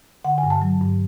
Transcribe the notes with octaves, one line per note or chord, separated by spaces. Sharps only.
D3 F#5
G#5
G2
A5
F#3
G2